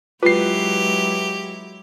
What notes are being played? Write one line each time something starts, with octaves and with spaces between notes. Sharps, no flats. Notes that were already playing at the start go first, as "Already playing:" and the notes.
F#3 G#3 E4 F4 G4 B4 C7